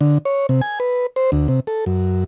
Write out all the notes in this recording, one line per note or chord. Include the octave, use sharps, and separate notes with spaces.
D3
C#5
C3
G#5
B4
C5
D2
C3
A4
F#2